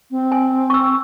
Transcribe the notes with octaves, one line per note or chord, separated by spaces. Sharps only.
C4
G#5
C#6 E6